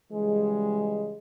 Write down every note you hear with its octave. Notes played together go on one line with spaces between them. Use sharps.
C#3 E3 G3 G#3